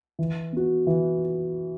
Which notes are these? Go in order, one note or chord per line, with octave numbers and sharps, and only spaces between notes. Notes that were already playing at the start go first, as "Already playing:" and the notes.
E3
B3 F#4
E3